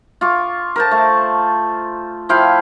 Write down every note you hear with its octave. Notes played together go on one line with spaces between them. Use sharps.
F4 C#6 D6
A#4 C5 A5
A3
F3 E4 F5 G5